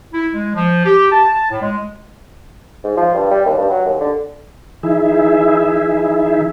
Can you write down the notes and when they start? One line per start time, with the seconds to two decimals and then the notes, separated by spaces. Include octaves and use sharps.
0.14 E4
0.34 G#3
0.56 F3
0.86 G4
1.12 A5
1.50 A2
1.62 G#3
2.84 G#2
2.97 F3
3.14 G2
3.31 G3
3.46 D#2
3.58 G2
3.70 F#3
3.86 D#2
4.00 D3
4.83 E3 D#4 E4 G#4 E5